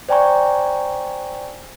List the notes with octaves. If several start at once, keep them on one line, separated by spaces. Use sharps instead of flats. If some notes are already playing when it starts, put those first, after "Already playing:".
C5 D5 G5 G#5 A#5 C#6